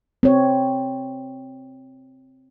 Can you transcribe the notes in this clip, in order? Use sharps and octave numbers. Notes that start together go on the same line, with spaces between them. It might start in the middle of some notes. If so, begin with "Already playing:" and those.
C4 C#5